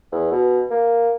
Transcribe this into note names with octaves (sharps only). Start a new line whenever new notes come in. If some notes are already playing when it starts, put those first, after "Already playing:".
E2
B2
A#3